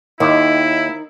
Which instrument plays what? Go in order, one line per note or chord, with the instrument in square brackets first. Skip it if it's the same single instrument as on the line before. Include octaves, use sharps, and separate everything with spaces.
[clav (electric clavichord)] D#2 [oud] D#3 [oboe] E4